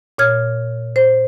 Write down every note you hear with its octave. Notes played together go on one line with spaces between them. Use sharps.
A#2 C#5 F6 G#6
C5